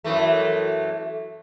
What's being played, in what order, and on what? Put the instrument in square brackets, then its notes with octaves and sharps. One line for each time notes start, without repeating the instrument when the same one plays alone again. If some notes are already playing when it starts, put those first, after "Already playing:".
[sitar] F#2 E3 A3